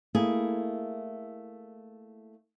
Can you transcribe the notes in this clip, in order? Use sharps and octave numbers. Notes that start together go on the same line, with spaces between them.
A3 A#3 E4 G#4